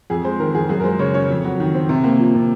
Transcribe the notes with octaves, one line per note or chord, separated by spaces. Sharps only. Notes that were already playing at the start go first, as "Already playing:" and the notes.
F2 G#4
G#3 C5
D#3 A#4
F2 G#4
F#2 G#4
A#4
G#3 C5
C#3 C#5
C#4 C#5
F2
F#3
D#3
C4
C3
A#3
F3
C3